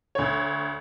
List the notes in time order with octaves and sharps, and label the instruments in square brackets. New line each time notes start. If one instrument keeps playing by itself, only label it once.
[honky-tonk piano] D2 C#5